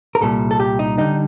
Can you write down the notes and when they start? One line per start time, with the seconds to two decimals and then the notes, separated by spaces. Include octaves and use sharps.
0.15 A#4
0.21 C2 A#2 G3 A4
0.51 A4
0.60 G4
0.79 D#4
0.98 D3 G3 D#4